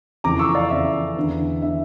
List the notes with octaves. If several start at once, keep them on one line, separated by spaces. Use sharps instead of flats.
F2 C#3 E3 A#5 D6
C#6 E6
D5 F5
F2 C#3 E3 E5
E2 D3
D3 E5